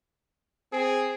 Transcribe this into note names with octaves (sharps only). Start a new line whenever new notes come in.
C4 G#4